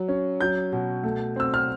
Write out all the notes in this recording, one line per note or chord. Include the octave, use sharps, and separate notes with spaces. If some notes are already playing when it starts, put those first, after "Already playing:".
Already playing: F#3
C#4
F#3 G6
B2
A3
C4 E6
F6